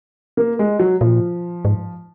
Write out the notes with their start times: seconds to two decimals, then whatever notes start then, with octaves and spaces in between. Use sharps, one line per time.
0.37 A#3
0.59 G#3
0.79 F#3
1.01 A#2 F3
1.65 G#2